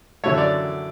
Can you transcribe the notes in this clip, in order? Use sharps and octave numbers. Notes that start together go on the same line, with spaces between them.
F#2 D3 F#3 A3 C#5
D5